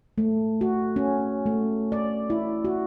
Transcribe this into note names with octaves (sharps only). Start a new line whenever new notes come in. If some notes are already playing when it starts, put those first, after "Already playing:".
A3
F#4
C#4
A3
D5
E4
F#4